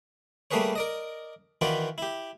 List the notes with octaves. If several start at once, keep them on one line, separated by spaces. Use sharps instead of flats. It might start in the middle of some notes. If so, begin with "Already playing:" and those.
G3 A3 A#3 G#4 B4 C#5
A#4 D5 D#5
D#3 E3 F4 F#4 B4 D5
E4 G4